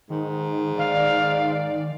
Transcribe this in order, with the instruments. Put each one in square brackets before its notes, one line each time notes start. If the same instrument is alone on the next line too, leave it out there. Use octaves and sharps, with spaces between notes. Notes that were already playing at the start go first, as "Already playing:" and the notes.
[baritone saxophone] G#2 [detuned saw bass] D#3
[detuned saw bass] D#3 [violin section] D5 [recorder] F5